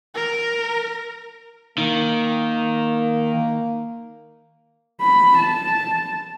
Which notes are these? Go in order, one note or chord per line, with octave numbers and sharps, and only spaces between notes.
A#4
D#3 A#3
B5
A5